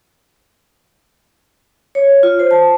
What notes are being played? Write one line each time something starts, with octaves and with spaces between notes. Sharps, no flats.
C#5
F4
C5
A5